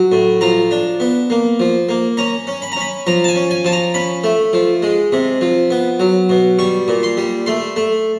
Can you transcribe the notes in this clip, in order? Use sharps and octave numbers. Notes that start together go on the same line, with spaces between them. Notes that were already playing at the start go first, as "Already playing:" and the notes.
Already playing: F#3
A2
F3 A#5
D4
B3
A#3
F3
A#3
C#4 A#5
C#4
B5
A#5
C#4 B5
F3 A#5
A5
G#5
C#4
G#5
F3 A5
A#5
C#4 B5
A3
F3
G#3
C3
F3
B3
F#3
B2
G3 C#6
A#2
C6
G3
A3 C6
A3